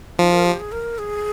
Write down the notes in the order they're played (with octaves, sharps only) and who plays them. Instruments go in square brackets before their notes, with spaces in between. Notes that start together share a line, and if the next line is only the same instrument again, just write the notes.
[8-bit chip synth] F3 [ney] D#4
[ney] A#4
G4
G#4
A#4
G#4